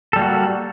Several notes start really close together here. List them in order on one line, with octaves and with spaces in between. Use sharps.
A4 G3 A#3 F#4